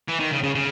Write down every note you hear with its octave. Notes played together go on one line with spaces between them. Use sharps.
E3
D#3
C#3
C#3
C#3